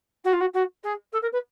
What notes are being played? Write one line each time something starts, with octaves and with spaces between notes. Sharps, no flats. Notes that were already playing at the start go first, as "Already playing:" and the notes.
F#4
F4
F#4
F#4
G#4
A4
A#4
B4